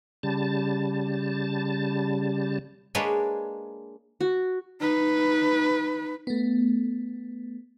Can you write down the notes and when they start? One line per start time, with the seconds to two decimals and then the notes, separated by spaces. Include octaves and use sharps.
0.23 C#3 G3 A5
2.95 G#3 A#3 D4 B4 C#5
4.21 F#4
4.80 D#4 B4
6.27 A3 B3